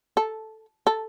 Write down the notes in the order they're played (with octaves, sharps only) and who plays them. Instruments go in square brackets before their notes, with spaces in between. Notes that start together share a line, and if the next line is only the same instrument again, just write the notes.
[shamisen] A4
A4